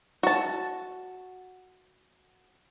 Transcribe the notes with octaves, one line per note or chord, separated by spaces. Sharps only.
F#4 A5